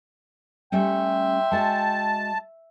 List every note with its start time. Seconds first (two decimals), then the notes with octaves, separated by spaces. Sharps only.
0.72 G3 A3 C#4 E5 G5 C6
1.52 G#3 F#4 G#5 A5